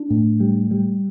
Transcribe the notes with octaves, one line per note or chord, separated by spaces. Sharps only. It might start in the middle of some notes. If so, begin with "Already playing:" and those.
Already playing: D4
A2
G3
G3